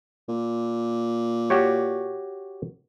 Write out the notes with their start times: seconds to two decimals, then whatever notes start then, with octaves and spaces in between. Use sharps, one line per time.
0.29 A#2
1.50 F#4 G4 C#5